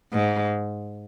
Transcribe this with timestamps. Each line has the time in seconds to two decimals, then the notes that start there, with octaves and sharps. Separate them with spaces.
0.13 G#2